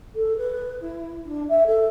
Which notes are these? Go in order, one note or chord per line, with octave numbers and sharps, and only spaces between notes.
A4
B4
E4
D4
E5
A4